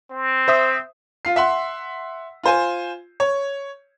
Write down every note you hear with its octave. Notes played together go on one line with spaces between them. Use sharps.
C4
C5 E5 D#6
F4 C7
E5 F#5 C6
F4 C5 G#5
C#5